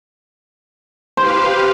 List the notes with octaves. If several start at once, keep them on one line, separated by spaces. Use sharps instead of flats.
G4 B4 C5 F5